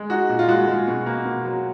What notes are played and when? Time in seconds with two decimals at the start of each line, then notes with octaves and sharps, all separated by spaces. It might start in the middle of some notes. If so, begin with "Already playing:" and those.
Already playing: G#3
0.10 D#4 F#4
0.29 A#2
0.39 F4
0.49 G#3 F#4
0.68 G#3
0.87 B2
1.06 A#3
1.25 B2
1.45 F#3